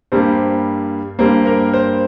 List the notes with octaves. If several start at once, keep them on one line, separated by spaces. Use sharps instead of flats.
G2 G3 A#3 C5
G2 G3 A#3 C5
A#4
C5